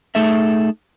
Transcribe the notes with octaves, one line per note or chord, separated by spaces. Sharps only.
A3 D#4 G#4 A4 E5